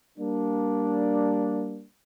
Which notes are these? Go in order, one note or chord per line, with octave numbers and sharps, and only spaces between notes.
G3 A#3 D4